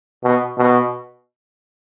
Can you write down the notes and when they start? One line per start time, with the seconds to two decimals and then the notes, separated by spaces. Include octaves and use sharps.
0.24 B2
0.58 B2